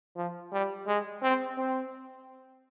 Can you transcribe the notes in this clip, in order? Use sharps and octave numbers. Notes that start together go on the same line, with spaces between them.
F3
G3
G#3
C4
C4